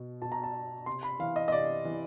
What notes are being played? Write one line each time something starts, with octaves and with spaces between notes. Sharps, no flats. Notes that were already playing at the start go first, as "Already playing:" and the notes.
Already playing: B2
B2 A5
A#5
A5
C3 C6
B5
E3 F5
D#5
D#5
C3 D5
E3